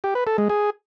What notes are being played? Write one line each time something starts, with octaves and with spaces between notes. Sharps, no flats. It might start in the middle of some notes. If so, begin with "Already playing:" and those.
G4
B4
A4
G#3
G#4